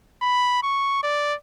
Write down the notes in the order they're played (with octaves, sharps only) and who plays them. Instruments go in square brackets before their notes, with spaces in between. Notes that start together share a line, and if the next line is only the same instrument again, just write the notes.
[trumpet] B5
C#6
D5